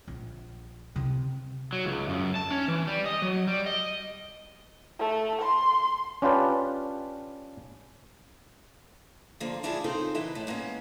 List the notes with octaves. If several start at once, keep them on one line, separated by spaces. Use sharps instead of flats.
A#1
C3 C4
F#3
C#2
F#2
A5
C#4
E3
G3
D#5
F#3
G3
D#5
A3
C6
C#4 D4 F4 G4 B4 D5
D3 F3 A#3
G#3 D4 E4 F4 G#4
C#3 C4 D#4 F4 A4 A#4
E3 E4 B4 D#5 E5
A2
G#3 A#3 B3 C#4